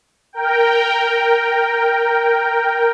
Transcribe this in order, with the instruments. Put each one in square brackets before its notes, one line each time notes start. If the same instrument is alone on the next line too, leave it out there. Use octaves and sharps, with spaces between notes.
[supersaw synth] A#4 G5